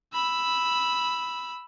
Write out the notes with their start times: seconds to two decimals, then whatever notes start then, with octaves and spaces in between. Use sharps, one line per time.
0.13 B5 E6